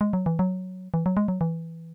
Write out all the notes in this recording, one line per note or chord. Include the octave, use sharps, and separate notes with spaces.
G#3
F#3
E3
F#3
E3
F#3
G#3
F#3
E3